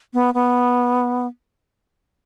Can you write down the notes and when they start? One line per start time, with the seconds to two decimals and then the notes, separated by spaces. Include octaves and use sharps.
0.13 B3
0.34 B3